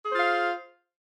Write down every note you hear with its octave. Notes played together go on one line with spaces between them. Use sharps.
F4 G#4 C5 F5